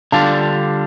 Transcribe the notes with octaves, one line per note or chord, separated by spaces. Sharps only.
D3 G3 D4 F4 F5 A5